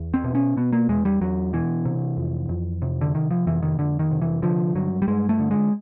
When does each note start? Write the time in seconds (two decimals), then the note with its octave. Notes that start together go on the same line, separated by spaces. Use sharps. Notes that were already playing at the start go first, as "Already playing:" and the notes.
Already playing: E2
0.14 C4
0.24 B2
0.35 C#4
0.57 B2 B3
0.73 A#3
0.89 E2 G#3
1.05 G3
1.21 E2 F#3
1.53 B2 E3
1.85 C3
2.17 F2
2.49 F2
2.82 C3
3.01 D3
3.14 C3 D#3
3.31 F3
3.47 F2 E3
3.62 D#3
3.78 F2 D3
3.99 D#3
4.11 C3
4.22 E3
4.42 D3 F3
4.75 G2 F#3
5.02 G3
5.08 G2 G#3
5.29 A3
5.39 D3
5.51 G#3